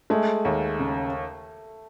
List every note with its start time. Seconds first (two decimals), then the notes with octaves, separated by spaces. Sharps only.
0.10 G#3 A3
0.45 D#2
0.79 C#3